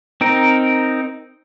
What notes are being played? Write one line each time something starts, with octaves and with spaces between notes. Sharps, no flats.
C4 D#4 A#4